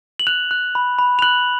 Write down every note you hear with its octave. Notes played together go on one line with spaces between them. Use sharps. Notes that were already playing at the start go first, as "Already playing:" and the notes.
F#7
F#6 F7
F#6
B5
B5
F7
F#6 F#7